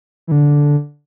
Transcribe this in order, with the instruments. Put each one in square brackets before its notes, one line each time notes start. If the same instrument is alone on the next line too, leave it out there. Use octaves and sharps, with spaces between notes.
[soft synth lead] E3
D3